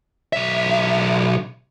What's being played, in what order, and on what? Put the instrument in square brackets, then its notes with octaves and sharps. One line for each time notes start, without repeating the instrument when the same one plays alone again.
[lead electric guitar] B1 E5